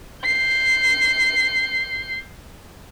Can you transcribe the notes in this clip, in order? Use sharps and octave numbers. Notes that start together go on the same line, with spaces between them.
G6 C7